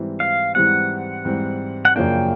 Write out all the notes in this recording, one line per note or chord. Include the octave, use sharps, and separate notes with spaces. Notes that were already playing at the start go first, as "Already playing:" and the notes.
Already playing: G#2 E3 G3 C4
F5
G#2 E3 G3 C4 F#5
G#2 E3 G3 C4
F#5
F#2 C#3 F3 A#3 D4 G5